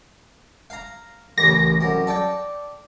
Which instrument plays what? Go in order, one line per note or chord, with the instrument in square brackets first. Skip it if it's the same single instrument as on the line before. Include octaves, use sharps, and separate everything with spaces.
[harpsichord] F5 A#5
[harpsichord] A1 D#2 C#3 [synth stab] A#6
[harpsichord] C2 F#2
A4 D5 G5